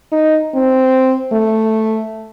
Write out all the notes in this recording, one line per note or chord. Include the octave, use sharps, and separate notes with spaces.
D#4
C4
A3